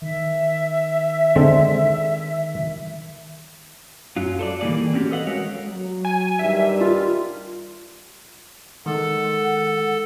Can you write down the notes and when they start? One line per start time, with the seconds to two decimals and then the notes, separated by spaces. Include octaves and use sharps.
0.02 D#3 E5
1.36 D3 G#3 C4
4.16 F#2 F#3 F4
4.39 A4 C5 D5
4.61 D#3 E3 G3 A#3 G#4 D5
4.93 C4 C#4 F#4 G4
5.11 A4 B4 D#5 F5 F#5
5.27 G#3 F#4 A#4 C#5
5.70 F#3
6.05 G#5
6.39 G2 D#3 G3 E5
6.81 F4
8.86 D#3 G#3 A4 F#5